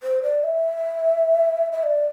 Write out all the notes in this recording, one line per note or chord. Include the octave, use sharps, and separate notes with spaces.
C5
D5
E5
E5
D5